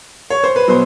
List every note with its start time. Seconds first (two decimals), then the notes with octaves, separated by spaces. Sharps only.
0.30 C#5
0.44 C5
0.56 B4
0.68 B2 F#3 C5